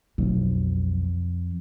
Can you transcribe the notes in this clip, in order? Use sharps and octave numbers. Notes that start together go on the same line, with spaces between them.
B1 F2